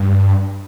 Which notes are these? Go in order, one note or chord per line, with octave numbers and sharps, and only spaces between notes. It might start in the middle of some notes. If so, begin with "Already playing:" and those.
Already playing: G2